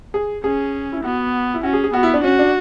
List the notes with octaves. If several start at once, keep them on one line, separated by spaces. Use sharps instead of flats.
G#4
C#4 G#4
E4
B3 F#4
E4
C#4 F#4
G#4
G#4
B3 F#4
E4
D4
C#4 F#4
D4